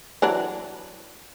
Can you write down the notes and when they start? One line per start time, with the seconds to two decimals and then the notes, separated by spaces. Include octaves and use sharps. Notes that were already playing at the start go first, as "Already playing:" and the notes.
0.22 E3 F#3 D4